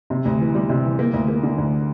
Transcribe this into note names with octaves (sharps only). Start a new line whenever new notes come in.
C3
D2
E3
G3
C3
E3
A#3
D2
A#3
D3
D2